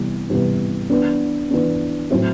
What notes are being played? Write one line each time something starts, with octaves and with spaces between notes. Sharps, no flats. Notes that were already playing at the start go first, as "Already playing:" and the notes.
Already playing: C3 E3 G3 B3
C3 E3 G3 B3
E3 B3 D4
E3 B3 D4
A2 F#3 C4 E4